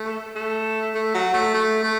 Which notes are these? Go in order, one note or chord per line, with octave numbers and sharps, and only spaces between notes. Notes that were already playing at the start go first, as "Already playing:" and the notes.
Already playing: A3
A3
A3
F#3
A3
A3
A3